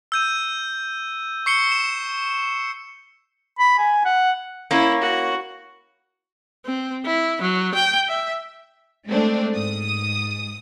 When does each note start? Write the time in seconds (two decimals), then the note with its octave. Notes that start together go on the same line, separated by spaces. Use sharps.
0.12 E6 G6 D#7
1.46 C#6 C7 C#7 G7
1.72 E7
3.59 B5
3.78 G#5
4.05 F#5
4.71 A#3 C#4 E4
5.01 F#4
6.66 C4
7.06 E4
7.42 F#3
7.75 G5
8.09 E5
9.07 G#3 A3 C4 D4
9.55 G#2 D#6